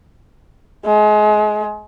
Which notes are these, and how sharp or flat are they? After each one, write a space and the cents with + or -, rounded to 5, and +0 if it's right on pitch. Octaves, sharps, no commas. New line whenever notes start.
G#3 +30